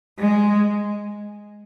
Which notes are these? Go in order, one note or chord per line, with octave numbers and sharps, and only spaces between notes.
G#3